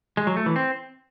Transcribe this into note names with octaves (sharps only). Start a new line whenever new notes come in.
G#3
F#3
A3
E3
C4